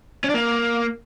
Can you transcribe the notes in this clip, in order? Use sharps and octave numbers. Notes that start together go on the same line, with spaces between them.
C#4
D4
A#3